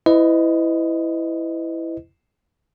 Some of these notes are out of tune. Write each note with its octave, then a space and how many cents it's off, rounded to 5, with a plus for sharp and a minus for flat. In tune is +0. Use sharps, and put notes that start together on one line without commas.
E4 +0 B4 +40 D#5 +0